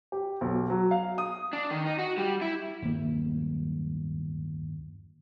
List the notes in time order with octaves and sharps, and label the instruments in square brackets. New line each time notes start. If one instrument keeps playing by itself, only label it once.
[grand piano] G4
B1
F#3
F5
D#6
[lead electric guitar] D4
D#3
D#4
F#4
G3
E4
[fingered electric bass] D1 G1 D#2 A#3